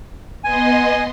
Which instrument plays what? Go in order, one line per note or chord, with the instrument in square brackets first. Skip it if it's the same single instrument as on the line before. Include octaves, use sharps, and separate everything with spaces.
[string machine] B3 D#5 C6 [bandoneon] G#5